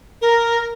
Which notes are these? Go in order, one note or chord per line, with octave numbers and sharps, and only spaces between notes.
A#4